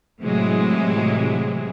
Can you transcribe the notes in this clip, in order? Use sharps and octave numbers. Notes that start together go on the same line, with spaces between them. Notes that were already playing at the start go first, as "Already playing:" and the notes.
A2 C3 E3 F#3 G#3